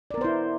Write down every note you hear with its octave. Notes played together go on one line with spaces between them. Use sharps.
B3 E4 A#4 C5 D5